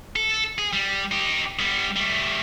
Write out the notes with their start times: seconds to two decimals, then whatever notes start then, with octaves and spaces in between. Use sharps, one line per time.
0.16 A4
0.58 G#4
0.73 G3
1.11 D#4 G4
1.60 G3 B3
1.96 G3 A3